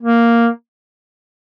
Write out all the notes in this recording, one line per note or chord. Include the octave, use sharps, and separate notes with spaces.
A#3